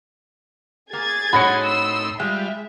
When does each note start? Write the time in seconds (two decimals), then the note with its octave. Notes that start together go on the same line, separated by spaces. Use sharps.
0.93 A#3 G#4 G#6 A6
1.33 A2 D#4 F#4 C#5 B5 C6 A#6 C#7
1.64 E6
2.20 G3 G#3 F4 E5